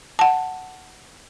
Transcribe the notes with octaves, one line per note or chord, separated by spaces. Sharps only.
F#5 A5